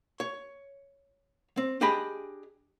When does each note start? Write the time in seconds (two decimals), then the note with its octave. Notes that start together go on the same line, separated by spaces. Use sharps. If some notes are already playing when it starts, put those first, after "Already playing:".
0.20 C#5
1.57 C4
1.81 D4 G4 G#4 D#5 B5